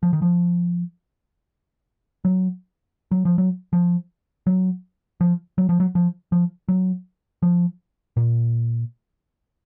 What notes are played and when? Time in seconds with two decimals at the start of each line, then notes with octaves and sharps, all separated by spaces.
0.03 F3
0.13 D#3
0.22 F3
2.25 F#3
3.11 F#3
3.25 F3
3.38 F#3
3.73 F3
4.47 F#3
5.21 F3
5.58 F#3
5.69 F3
5.80 F#3
5.95 F3
6.32 F3
6.68 F#3
7.42 F3
8.17 A#2